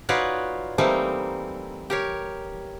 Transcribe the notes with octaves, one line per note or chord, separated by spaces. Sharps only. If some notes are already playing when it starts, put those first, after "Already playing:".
D#4 F4 F#4 B4 C#5 D5
E3 G3 A3 A#3 C4 D#4
G4 A#4 C#5